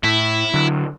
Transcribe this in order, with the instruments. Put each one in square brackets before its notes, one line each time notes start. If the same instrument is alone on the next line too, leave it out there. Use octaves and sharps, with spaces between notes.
[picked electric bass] A2 [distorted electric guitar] E4 E5
[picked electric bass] D3 F#3